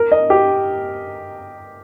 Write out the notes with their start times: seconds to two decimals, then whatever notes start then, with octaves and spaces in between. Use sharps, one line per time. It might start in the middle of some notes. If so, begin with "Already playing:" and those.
Already playing: A#4
0.12 D#5
0.30 G4